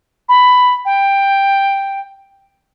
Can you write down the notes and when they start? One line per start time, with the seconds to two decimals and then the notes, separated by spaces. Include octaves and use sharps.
0.29 B5
0.85 G5